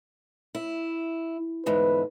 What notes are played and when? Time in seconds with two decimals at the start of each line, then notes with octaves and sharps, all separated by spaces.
0.55 E4
1.66 E2 G#2 D3 B4